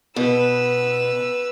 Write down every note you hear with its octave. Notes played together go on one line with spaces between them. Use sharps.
B2 B4 E6